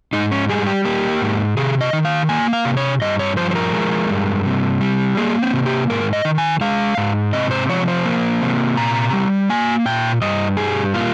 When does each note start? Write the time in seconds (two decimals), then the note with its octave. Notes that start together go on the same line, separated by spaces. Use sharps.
0.13 G#2 D#4
0.31 C#4
0.49 G3 G#4
0.67 G4
0.85 A#3 G4
1.22 G#2
1.57 C3 G#4
1.81 D#5
1.93 D#3
2.05 F5
2.29 A#3 G#5
2.53 F5
2.65 C3
2.77 C#5
3.01 G2 D#5
3.19 C#5
3.37 F3 C5
3.51 C5
3.55 A#4
3.73 G#3
4.10 G2
4.46 C3
4.81 G3
5.17 A#3 G#4
5.42 C4
5.53 C3
5.66 G4
5.90 G#2 A#4
6.13 D#5
6.25 D#3
6.38 G#5
6.61 G#3 F5
6.98 G#2
7.33 C3 D#5
7.51 C5
7.69 F3 C#5
7.88 C5
8.05 A#3
8.42 C3
8.77 A#2 A#5
9.13 G3
9.49 A#3 G#5
9.86 A#2 G5
10.21 G2 D#5
10.57 G3 G#4
10.94 A#3 F4